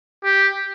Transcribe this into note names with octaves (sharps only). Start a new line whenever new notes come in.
G4